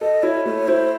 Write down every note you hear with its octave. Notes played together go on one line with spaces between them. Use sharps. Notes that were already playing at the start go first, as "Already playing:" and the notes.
A4 D#5
E4 C#5
A3 C#5
E4 C5